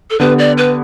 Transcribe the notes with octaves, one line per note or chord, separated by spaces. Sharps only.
A4
D3 B3 G4 B4
D5
B4